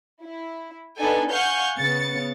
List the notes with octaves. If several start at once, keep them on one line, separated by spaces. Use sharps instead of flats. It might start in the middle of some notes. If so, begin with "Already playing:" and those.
E4
B3 D4 D#4 A4 G#5
F5 F#5 G#5 C#6 F6 G6
C#3 B3 A6 C#7